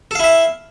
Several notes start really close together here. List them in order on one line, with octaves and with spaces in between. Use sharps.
A4 F5 E4 E5